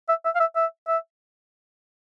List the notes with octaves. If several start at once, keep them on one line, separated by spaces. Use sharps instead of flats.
E5
E5
F5
E5
E5
E5